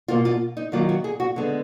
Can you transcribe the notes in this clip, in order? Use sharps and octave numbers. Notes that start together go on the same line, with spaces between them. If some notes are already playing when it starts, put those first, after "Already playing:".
B2 A#3 F4
F4
D#4
D#3 F#3 A#3 F4
F#4
G#4
F#4
D3 G#3 B3